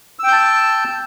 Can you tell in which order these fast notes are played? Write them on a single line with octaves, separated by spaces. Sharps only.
E6 G5 G6 A5